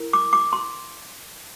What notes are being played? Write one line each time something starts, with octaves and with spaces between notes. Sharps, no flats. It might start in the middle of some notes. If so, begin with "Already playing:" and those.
Already playing: E4 A#4
D6
D6
C6